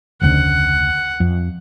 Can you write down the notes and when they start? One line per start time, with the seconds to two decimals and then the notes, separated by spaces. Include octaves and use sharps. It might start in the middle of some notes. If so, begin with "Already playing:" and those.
0.21 F1 D2 C#3 F#5
1.20 F2